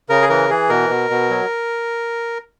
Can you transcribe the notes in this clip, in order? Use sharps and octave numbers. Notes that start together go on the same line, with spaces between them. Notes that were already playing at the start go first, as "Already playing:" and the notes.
C#3 A#4
G#4
E3 A#4
E3 G#4
B2 A#4
B2
B2
F#3